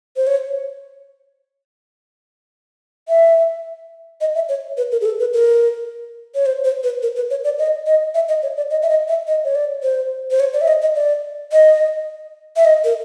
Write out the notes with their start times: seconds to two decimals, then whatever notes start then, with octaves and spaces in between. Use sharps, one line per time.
0.17 C5
0.27 C#5
3.08 E5
4.21 D#5
4.35 E5
4.49 C#5
4.77 B4
4.92 A#4
5.01 G#4
5.05 A4
5.20 B4
5.34 A#4
6.35 C#5
6.46 C5
6.65 C5
6.84 B4
7.02 A#4
7.16 B4
7.30 C#5
7.44 D5
7.59 D#5
7.87 D#5
8.14 E5
8.29 D#5
8.43 C#5
8.57 D5
8.71 D#5
8.83 E5
8.89 D#5
9.08 E5
9.28 D#5
9.44 C#5
9.55 D5
9.83 C5
10.31 C5
10.40 C#5
10.53 D5
10.61 E5
10.68 D#5
10.82 D#5
10.96 D5
11.52 D#5
12.56 E5
12.65 D#5
12.84 A#4